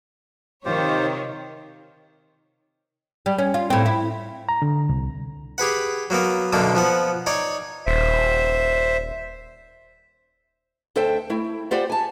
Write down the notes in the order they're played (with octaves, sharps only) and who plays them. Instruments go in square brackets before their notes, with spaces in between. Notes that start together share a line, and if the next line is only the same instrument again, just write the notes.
[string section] C3 D#3 C#5 [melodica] F4 G4 C5
[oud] G3
C#4
F4
A2 C4
E4
[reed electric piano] A#5
D3
C2
[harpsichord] G4 G#4 B4 F#5
F#3 A#3 B3 A#4
B1 F#2 B2 D3 A#3 A4
F3 B3 F#5
D#4 C#5 D5 G#5
[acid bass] D#1 [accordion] C5 E5
[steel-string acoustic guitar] D2 A4 C5 E5 G5
A3 E4
F4 G4 C5 D5 F#5
G#5 A5